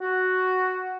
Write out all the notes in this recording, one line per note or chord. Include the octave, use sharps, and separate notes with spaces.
F#4